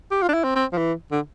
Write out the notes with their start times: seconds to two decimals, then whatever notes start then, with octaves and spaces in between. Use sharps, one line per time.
0.11 G4
0.22 F4
0.29 D4
0.33 E4
0.44 C4
0.55 C4
0.72 F3
0.78 E3
1.11 D3